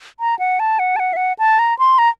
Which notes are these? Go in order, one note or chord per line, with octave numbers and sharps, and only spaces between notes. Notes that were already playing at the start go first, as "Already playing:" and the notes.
A#5
F#5
A5
F#5
A5
F#5
E5
F#5
A5
A#5
C6
A#5